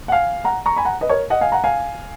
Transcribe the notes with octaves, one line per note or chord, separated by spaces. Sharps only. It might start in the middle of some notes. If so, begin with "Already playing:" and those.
F#5
F5 G#5
F#5 A#5
A#5 C#6
G#5 B5
F#5 A#5
B4 D#5
A#4 C#5
D#5 F#5
F5 G#5
F#5 A#5
F5 G#5